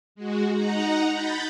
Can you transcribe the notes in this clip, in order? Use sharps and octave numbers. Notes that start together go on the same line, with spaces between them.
G#3 F#4
D#4 F#5 A#5
B5 G6 A6